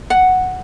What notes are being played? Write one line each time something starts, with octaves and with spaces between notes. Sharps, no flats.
F#5